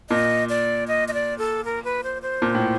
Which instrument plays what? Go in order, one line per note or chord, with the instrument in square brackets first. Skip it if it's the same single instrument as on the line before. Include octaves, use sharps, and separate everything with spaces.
[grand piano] A#2 [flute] D#5
[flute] D5
D#5
D#5
D5
A4
A#4
B4
C5
C5
[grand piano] A#2
A2